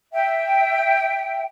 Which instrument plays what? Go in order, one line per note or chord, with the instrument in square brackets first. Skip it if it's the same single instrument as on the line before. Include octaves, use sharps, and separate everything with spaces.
[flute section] E5 G5